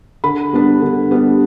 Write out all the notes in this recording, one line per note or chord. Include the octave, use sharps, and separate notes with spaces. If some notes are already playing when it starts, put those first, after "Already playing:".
D3 B5
G3 B3 D4
D3
G3 B3 D4